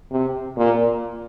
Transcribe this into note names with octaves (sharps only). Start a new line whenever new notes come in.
C3
A#2